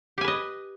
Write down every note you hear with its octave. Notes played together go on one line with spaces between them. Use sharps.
G4 B4 D#5 G#5